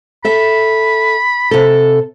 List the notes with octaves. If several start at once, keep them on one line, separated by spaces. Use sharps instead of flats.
A4 E5 B5
C3 A4